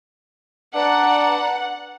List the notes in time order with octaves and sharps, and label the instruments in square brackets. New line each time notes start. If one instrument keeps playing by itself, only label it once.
[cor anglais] D4 [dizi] B4 [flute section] D5 A#5 [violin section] F#5